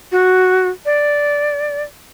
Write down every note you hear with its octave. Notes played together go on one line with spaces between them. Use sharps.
F#4
D5